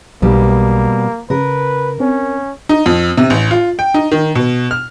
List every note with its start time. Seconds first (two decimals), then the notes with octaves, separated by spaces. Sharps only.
0.22 B1 B2 G3 A#3
1.30 C#3 A#4 B4
2.00 C4 C#4
2.69 D#4
2.86 F2
3.17 C3
3.30 A1
3.51 F4
3.79 G5
3.94 D#4
4.12 D#3
4.35 B2
4.71 F6